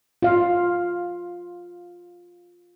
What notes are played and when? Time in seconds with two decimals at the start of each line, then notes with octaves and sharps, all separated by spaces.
0.22 F4 F5